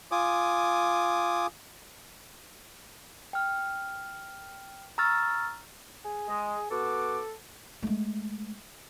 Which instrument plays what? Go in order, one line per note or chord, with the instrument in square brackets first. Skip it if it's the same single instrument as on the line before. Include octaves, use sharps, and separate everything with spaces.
[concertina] F4 G#5 D6 D#6
[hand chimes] G5 F6
A#5 C#6 E6 F6 A6
[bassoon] G#4
[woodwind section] G#3 D#5
[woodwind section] B2 F#4 D6 [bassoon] A4
[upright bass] G#3 A3